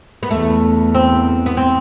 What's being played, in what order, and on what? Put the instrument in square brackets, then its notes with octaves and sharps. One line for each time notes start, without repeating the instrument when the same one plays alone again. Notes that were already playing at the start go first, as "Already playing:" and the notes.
[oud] B3
[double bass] E2 [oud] A3
[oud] C4
B3
C4